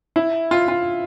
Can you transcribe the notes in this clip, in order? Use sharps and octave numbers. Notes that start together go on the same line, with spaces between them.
E4
F4
F4